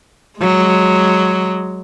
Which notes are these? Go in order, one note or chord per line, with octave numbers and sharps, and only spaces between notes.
F#3 G#3